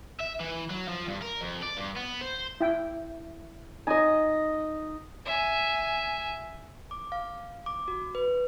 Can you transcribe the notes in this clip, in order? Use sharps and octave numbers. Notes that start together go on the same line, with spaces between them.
E5
E3
F#3
F3
G2
A#4
F2
D5
G2
B3
C5
E4 G5
D#4 D#5 G#5
E5 G#5
D6
F5
D6
F#4
B4